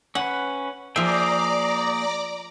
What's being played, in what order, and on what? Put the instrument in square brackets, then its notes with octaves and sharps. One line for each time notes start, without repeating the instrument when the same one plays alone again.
[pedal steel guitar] C#4 B4 [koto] F#5
[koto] F3 E5 [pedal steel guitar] A#3 G#4 G5 [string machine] D5 A#5 D6